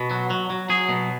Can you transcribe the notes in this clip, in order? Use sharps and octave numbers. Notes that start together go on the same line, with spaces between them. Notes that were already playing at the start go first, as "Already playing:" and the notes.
Already playing: B2
F#3
F#3
F#3
F#3 G#4
B2